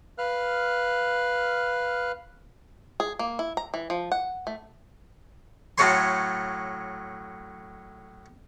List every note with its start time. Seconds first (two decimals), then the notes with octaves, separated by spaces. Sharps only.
0.18 B4 F5 F6 F#6
3.00 G#4
3.19 A#3
3.39 E4
3.57 A#5
3.74 E3
3.90 F3
4.12 F#5
4.47 A3
5.78 A2 F#3 A3 C#5 G#5 C6